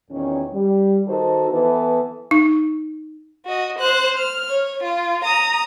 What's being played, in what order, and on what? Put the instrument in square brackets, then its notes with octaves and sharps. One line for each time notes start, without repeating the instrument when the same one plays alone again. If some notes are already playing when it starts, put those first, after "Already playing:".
[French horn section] E2 A#2 D#3 C#4
G3
D#3 D#4 F#4 A4 A#4 C5
E3 B3 E4 A4 B4
[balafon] D#4
[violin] F#4 D#5
C5 F#6
F6
C#5
F4
A#5 D#6